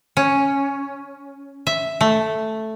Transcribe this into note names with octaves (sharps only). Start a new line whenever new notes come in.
C#4
E5
A3